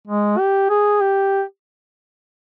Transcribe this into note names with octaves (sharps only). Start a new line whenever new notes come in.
G#3
G4
G#4
G4